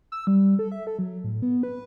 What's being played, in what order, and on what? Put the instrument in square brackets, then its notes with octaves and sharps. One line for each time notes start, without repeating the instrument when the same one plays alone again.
[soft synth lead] E6
G3
A4
E5
A4
F#3
A2
B3
B4